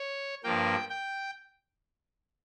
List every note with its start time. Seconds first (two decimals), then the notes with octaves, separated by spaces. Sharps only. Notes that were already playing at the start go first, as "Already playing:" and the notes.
Already playing: C#5
0.44 G2 F3 A#3 G5
0.90 G5